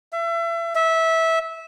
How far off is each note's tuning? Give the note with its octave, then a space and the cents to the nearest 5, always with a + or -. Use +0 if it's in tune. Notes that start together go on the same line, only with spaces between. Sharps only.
E5 +30
E5 -15